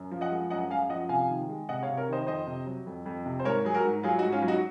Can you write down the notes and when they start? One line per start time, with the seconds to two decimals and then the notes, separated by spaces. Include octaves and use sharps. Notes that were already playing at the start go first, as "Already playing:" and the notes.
Already playing: F#2
0.11 F3
0.21 D#5 F#5
0.31 G#3
0.50 F#2 D#5 F#5
0.70 F#2 F5 G#5
0.90 F3 D#5 F#5
1.09 C3 F5 G#5
1.29 D#3
1.49 G#3
1.69 C3 D#5 F#5
1.83 C#5 F5
1.88 C3
1.97 A#4 C#5
2.08 D#3 C5 D#5
2.27 F2 C5 D#5
2.47 C3
2.66 F#3
2.87 F2
3.06 F2
3.25 C3
3.39 C5
3.44 G#2 A#4 C#5
3.65 F#3 G#4
3.74 F#4 A#4
3.84 G#2
4.03 F#3 F4 G#4
4.18 D#4 F#4
4.24 G#2
4.32 C#4 F4
4.42 F#3
4.48 D#4 F#4